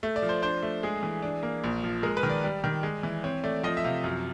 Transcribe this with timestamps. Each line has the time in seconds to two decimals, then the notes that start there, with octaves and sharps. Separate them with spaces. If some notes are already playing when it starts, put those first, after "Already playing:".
0.03 A3
0.16 D5
0.23 F3
0.29 C5
0.42 D4 C5
0.63 A3
0.83 G#3 G#4
1.03 E3
1.22 D4
1.43 A#3
1.64 A#1
1.83 F3
2.03 G#3 A#4
2.17 B4
2.23 D#3
2.30 D5
2.44 G3
2.64 D#3
2.83 G#3
3.03 E3
3.24 C4 C#5
3.44 A3 D5
3.63 F3 D#5
3.77 E5
3.84 C3 F5
4.04 F#2